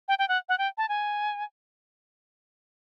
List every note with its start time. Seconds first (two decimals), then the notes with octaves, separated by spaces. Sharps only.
0.08 G5
0.19 G5
0.28 F#5
0.49 F#5
0.58 G5
0.78 A5
0.89 G#5